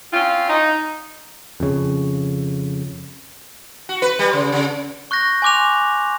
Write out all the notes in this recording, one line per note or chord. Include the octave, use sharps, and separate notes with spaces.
C4 C#4 F4
D#4
F2 C#3
F#4
B4
G3
C#3
C#3
C#6 F#6 G6 A#6
G#5 C6 D6 F#6 F7